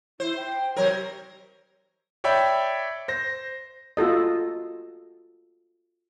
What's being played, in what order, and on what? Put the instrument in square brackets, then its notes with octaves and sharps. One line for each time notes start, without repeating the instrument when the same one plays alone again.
[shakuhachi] E4 [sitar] C5
[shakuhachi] G5
[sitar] C3 F#3 A#4 [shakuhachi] C#5
[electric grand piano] C#5 D5 E5 G5 B5
C5 A#6
[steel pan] F4 F#4 A4 D#5